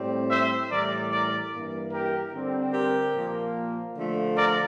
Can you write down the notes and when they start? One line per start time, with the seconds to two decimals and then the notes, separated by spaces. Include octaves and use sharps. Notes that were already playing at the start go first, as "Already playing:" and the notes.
Already playing: A2 G3 C4
0.30 C5 E5
0.70 A2 E3 G3 A#4 D5
1.11 A#4 D5
1.51 G2 E3 A#3
1.92 G4 A#4
2.33 D3 G3 C4
2.74 G4 A#4
3.14 A#2 F3 A#3
3.96 D3 F3 A3
4.36 A#4 D5